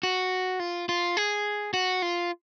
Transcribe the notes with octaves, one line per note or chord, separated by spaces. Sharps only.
F#4
F4
F4
G#4
F#4
F4